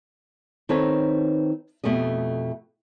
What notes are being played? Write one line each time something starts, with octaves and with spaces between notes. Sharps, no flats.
D#3 C4 D#4 A4 B4 C#5
F2 B2 A3 G4 D#5